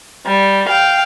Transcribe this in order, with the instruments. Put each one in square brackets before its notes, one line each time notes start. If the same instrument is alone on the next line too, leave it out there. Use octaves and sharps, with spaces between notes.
[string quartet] G3
F5 G5